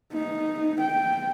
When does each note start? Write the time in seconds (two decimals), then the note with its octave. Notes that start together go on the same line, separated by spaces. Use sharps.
0.13 D#4
0.81 G5